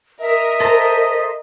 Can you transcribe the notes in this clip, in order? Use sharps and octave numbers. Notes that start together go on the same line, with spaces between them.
A#4 D#5 E5
A4 C5 A#5